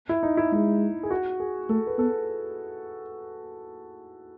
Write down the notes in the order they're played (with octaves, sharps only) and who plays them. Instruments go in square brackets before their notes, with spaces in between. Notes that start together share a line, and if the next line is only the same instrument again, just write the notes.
[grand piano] E4
D#4
E4
[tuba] G#3 [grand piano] E4
[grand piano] G#4
F#4
G#4
[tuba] A3 [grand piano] A4
[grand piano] B4
[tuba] B3 [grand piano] A4